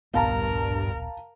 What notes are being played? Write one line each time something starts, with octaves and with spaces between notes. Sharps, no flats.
D1 A#1 G2 B3 A#4 F5 A5 A#5